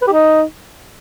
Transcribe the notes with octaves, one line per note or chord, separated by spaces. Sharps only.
B4
G4
D#4